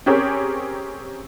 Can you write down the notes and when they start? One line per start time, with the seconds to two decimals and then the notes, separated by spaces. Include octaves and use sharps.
0.06 C4 C#4 G4 G#4 A#4 C#5